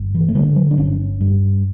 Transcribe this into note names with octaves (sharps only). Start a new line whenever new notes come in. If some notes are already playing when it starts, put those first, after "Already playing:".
Already playing: G1
E3
A3
D3 G3
F#3
D4
G1 C#4
G2